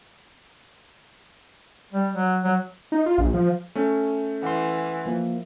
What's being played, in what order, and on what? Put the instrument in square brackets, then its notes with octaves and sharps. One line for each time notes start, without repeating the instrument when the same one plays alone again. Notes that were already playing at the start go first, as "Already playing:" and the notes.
[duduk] G3
F#3
F#3
[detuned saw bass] D#4
F4
A#1
F3
[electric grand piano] A3 C#4
[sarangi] E3 [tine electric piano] F#5 C6
[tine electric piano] F3 A#3